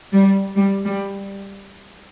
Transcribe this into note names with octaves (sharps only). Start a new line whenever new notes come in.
G3
G3
G3